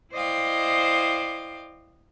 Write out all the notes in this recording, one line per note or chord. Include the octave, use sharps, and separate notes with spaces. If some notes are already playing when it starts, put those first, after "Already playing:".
E4 C5 D5 D#5 F5 G5